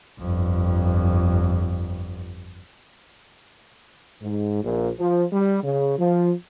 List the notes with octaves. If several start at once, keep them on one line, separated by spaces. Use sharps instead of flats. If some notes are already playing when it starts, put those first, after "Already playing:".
G1 F2
G#2
A#1
F3
G3
C#3
F3